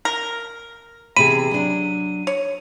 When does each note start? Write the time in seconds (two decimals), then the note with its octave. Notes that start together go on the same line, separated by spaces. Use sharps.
0.05 A#4
1.17 E2 C3 G#4 B5 D#7
1.51 F#3 D4
2.27 C#5